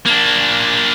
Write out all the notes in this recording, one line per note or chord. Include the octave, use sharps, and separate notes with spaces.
A#3 D4